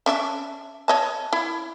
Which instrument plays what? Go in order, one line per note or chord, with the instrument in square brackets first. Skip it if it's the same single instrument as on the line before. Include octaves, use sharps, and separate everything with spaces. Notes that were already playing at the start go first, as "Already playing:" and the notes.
[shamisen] C#4 D4 E5
C#5 D#5 A5
E4